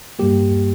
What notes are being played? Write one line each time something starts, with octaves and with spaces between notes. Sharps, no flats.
G2 G3 A#3 G4